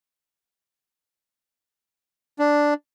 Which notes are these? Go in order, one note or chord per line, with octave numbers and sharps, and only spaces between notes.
D4